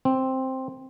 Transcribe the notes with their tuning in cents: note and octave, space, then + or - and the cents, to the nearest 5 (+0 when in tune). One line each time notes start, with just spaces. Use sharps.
C4 +5